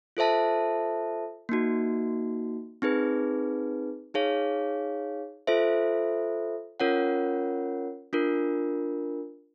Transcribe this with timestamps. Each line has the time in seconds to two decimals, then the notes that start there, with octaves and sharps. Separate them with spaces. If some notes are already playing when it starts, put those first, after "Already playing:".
0.17 F4 A4 C5 E5 A5
1.49 A#3 D#4 F#4
2.82 C4 D#4 G#4 B4
4.14 D#4 G#4 C#5 F5
5.47 F4 A4 C5 E5
6.80 C#4 F4 A#4 C#5 F#5
8.13 D4 F4 A#4